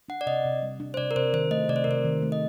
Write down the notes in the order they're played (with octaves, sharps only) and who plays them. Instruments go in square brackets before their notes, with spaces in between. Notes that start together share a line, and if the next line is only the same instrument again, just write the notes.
[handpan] D4 [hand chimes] F#5
[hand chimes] D5
[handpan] C3 [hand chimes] D#5
[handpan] C3
G3
D4
[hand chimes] C5
[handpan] C3 [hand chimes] D5
[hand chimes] A#4
[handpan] C3 [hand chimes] C5
[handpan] D#3 [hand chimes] C5
[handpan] A3 [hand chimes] D#5
[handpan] C3 [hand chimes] D5
[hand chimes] C5
A#4
[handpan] C3 [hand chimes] C5
[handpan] D#3
A3
[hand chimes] D#5